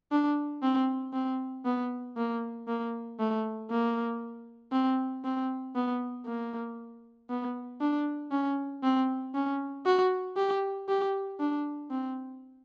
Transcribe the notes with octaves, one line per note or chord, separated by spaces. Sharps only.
D4
C4
C4
B3
A#3
A#3
A3
A#3
C4
C4
B3
A#3
B3
D4
C#4
C4
C#4
F#4
G4
G4
D4
C4